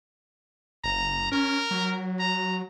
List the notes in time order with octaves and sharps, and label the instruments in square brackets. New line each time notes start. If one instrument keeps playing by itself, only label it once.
[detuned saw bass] F#1 [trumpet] A#5
[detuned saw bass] C#4 [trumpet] A#4
[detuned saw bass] F#3
[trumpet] A#5